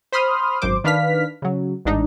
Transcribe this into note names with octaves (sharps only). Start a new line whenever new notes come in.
C5 B5 C6 D#6 F6
G#1 F#2 C5 D6
D#3 D4 B4 F5 F6 B6
C#3 F#3
A1 G#2 D4 D#4